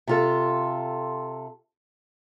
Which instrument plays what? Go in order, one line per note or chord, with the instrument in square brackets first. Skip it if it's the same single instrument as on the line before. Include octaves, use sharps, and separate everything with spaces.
[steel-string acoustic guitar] C3 F4 A4